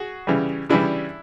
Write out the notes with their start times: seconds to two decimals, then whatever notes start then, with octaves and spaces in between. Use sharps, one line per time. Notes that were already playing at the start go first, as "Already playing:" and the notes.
Already playing: F#4 G#4
0.27 C#3 E3 G3
0.69 C#3 E3 G3 D4 E4